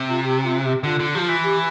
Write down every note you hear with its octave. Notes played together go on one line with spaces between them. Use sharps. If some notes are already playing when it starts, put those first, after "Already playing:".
Already playing: C3
F4
G4
F4
G4
D3 F4
D3
F3 F4 G4
E3
G4